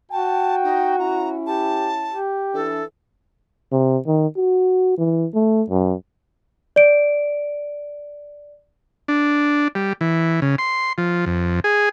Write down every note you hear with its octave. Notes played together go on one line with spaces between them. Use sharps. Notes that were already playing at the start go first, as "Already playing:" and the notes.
F#4 G5 A5
D#4
C#4 E4 A#5
G4 A5
G4
E3 D4 A4
C3
D#3
F#4
E3
A3
F#2
D5 D7
D4
G3
E3
C#3
C6
F3
F2
G#4